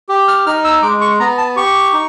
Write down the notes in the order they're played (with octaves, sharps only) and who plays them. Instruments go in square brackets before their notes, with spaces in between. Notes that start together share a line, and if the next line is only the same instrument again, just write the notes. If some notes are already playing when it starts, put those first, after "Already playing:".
[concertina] G4
F6
D#4 F6
E6
G#3 D6
C#6
B3 A#5
A5
G4 C#6
D#4